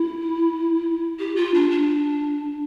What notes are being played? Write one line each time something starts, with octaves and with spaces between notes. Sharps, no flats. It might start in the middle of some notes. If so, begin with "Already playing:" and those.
Already playing: E4
G4
F4
D4
D4